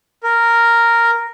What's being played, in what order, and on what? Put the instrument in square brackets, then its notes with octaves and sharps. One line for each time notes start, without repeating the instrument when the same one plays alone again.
[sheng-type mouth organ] A#4